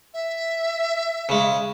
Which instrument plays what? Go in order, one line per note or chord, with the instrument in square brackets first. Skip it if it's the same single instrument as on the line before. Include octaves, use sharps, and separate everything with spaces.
[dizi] E5
[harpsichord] C#3 G#3